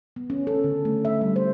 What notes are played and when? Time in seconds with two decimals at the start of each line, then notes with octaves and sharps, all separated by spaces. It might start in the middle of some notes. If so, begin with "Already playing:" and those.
0.16 B3
0.30 C#4
0.47 A4
0.64 D3
0.85 A3
1.05 E5
1.21 G3
1.36 C5